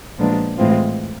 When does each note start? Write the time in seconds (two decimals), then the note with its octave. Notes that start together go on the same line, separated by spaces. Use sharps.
0.18 A#2 F3 G#3 B3 D4
0.57 A2 E3 G#3 C4 F4